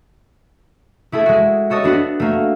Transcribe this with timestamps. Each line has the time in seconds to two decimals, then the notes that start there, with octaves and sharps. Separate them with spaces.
1.12 A3 E4 G#4 A4
1.26 G#3 F#4
1.70 F#4 A4 C#5 D#5
1.84 B3 D4 F#4 B4
2.20 A3 A#3